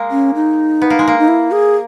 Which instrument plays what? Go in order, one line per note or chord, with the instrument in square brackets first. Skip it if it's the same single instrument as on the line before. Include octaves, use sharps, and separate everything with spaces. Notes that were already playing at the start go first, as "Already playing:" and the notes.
Already playing: [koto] G#3 A#3
[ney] C#4
D#4
[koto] B3
A#3
G#3
A#3
[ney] D#4
E4
G#4